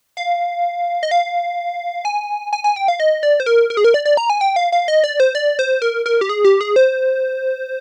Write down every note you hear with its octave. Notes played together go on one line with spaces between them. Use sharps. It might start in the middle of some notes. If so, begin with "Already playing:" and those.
F5
D#5
F5
G#5
G#5
G#5
G5
F5
D#5
D5
C5
A#4
A#4
G#4
A#4
D5
D5
A#5
G#5
G5
F5
F5
D#5
D5
C5
D5
C5
A#4
A#4
G4
G#4
G4
G#4
C5